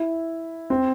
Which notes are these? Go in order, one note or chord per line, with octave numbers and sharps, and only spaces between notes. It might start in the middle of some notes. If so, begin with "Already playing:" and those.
Already playing: E4
C4